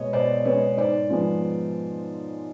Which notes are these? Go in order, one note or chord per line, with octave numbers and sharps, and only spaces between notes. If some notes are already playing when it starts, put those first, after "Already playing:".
Already playing: B2 G#3 B3 C#5 D#5
B2 C5 D5
G#3 B3 B4 C#5
G#2 C5 D5
F3 G#3 B3